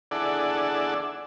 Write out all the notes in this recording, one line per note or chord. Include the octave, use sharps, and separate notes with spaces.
D4 E4 G#4 A4 D5 F#5